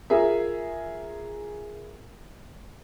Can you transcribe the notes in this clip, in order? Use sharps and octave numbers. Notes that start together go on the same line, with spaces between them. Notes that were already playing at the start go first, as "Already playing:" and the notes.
F4 G#4 A#4 E5